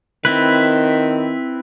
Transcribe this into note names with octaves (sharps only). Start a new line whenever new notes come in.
D#3 C4 E4 B4